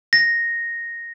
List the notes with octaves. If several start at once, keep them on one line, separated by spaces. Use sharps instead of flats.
A#6